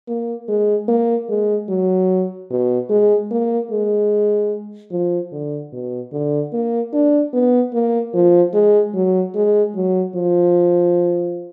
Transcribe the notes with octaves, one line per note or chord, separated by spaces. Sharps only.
A#3
G#3
A#3
G#3
F#3
B2
G#3
A#3
G#3
F3
D3
B2
D3
A#3
D4
B3
A#3
F3
G#3
F#3
G#3
F#3
F3